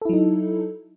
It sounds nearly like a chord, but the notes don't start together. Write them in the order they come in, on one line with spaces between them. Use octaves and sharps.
A4 E4 F#3 D#4